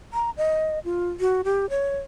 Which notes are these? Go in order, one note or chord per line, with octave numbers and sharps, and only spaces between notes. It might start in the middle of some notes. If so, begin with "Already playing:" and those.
A#5
D#5
F4
F#4
G4
C#5